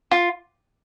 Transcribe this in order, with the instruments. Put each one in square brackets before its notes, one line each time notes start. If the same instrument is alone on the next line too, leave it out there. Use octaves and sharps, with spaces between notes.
[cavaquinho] F4